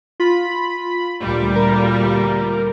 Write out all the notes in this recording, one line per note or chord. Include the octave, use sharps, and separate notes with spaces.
F4 B5
D2 A#2 G3
A#4